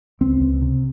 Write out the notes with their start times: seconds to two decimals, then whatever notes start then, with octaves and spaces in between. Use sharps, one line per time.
0.21 C#2 C4
0.40 C#2
0.61 C3